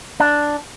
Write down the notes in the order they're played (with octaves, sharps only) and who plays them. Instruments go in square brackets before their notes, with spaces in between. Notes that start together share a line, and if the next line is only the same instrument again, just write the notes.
[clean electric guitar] D4